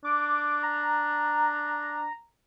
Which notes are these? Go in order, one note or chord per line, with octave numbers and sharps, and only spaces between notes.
D4 D6
A#5